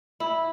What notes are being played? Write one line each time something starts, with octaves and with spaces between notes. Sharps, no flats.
E4